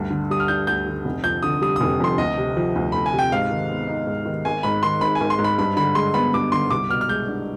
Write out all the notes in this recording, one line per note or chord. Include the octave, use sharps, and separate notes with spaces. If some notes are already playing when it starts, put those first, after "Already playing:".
Already playing: D2 G2
D3
G3 D#6
F6
D4 G6
D2 G6
D3
F1
F2 G6
D3 D#6
G3 D#6
F1 D#6
F2 C6
D2 D#5
C3
F3
D2
D2 B5
G#5
C3
G5
G#2 F5
D#3
B3
D#4
G#2
D#3
G#1 G#5
G#2 B5
D#3 C6
G#1 B5
G#5
G#1
C6
G#2
B5
G2 B5
D3 B5
G#3 C6
B3 B5
G2 D6
D3 C6
C2 D6
B2 F6
F6
G#3 G6
D4